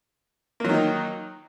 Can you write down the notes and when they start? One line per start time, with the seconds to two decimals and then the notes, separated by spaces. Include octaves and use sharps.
0.60 A#3
0.64 F#3
0.69 D#3
0.73 D#4